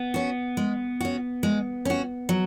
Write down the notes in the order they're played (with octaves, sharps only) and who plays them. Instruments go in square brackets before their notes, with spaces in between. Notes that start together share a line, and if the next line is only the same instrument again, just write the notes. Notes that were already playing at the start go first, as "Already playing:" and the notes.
Already playing: [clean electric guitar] B3
[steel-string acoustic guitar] C#4 F#4
G#3
C#4 F#4
G#3
C#4 F#4
F#3